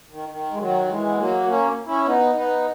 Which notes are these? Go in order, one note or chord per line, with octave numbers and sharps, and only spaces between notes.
D#3
D#3
G#3
D#3 F#3
E3 G#3
B3
F#3 A#3
A#3 C#4
C#4 E4
B3 D#4
B3 D#4